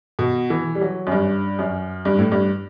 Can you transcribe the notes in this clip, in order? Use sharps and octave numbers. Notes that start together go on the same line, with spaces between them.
B2
E3
G3
F#3
F#2
G2
F#2
G2
A2
G2